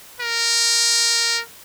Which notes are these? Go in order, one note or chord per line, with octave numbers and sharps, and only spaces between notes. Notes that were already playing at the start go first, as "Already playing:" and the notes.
A#4